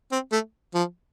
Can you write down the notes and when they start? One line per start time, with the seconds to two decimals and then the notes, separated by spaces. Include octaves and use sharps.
0.12 C4
0.32 A3
0.74 F3